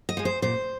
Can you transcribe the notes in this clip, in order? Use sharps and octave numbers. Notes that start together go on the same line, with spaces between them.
D#5
F3 G#3
C5
A#2 C5